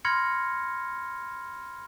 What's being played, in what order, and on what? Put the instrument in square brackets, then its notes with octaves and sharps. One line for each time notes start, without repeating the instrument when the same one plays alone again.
[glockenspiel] B5 C6 F6 G#6 A#6 C#7